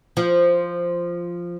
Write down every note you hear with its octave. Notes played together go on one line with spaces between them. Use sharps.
F3